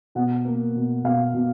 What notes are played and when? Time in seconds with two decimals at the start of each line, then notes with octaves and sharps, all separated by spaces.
0.15 B2 F#5
0.45 A#3
0.75 B2
1.04 B2 F5
1.34 B2